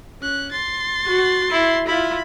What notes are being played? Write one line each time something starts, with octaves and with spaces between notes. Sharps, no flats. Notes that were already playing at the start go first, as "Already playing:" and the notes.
C#4 F#6
C6 A6
F#4
E4
E4 F4 B5